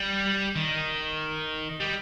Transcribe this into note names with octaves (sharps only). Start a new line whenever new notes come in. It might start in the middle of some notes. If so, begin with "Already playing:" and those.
Already playing: G3
D#3
G3